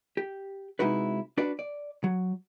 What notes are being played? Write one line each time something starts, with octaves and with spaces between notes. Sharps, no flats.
G4
C3 G#3 D#4 E4 F#4 B4
D4 F#4 B4 D5
D5
F#3